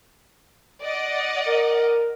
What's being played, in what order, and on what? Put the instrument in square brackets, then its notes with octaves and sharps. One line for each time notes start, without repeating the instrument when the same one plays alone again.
[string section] D5 D#5 F#5
[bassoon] A#4